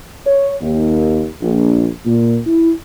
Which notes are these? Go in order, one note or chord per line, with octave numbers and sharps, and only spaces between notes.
C#5
D#2
A#1
A#2
E4